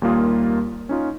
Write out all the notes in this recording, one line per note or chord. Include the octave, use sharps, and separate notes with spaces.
D#2 G3 A#3 F4 D#6
C#4 D#4 F4